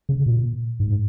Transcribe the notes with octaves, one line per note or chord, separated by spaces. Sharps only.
C#3
A#2
G#2